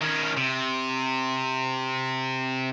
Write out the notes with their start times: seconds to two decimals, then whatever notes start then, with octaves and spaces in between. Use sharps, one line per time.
0.02 D#3 C#4
0.37 C3